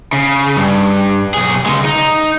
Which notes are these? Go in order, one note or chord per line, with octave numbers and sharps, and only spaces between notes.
C#3
G2
B1 G#4
C#2 G#3
D#4